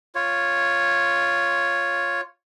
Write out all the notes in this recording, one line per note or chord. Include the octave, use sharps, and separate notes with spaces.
F4 C#5